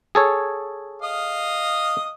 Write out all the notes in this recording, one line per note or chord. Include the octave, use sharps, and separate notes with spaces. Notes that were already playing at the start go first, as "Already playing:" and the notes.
G#4 A4 C#5
D#5 F5 D#6